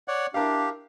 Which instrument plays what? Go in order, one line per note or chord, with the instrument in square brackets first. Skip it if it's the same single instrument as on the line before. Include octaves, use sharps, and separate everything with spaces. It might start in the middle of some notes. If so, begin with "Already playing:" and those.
[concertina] C#5 D5 F#5
[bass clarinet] D4 [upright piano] E4 A#4 F5 [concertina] G4